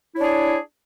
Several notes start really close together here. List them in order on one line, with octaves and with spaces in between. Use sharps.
E4 C#5 D4 G#4